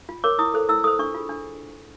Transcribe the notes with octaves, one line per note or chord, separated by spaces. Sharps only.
F4
A#4 C#5 D6
E4 D#6
A4 C5
E4 E6
A4 C5 D#6
D4 C#6
F4 G#4
D4